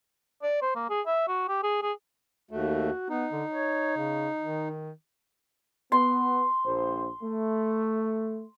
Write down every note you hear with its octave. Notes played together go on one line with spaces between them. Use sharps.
D5
C5
A#3
G#4
E5
F#4
G4
G#4
G#4
D#2 A3 F#4
B3 D#4
D3
C#5
C#3
D#3
B3 C6
A#1 C5
A3